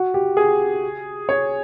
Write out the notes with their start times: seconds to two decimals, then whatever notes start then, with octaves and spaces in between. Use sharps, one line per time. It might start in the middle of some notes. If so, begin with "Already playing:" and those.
Already playing: F#4
0.14 G4
0.37 G#4
1.29 C#5